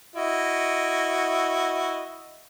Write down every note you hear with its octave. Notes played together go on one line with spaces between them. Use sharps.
E4 F#4 D#5